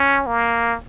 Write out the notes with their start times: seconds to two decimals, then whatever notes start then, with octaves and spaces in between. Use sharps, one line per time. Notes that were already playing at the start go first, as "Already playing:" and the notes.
Already playing: C#4
0.27 A#3